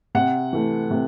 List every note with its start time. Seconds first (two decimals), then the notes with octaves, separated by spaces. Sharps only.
0.15 C3 F#5
0.53 E3 A3
0.91 C3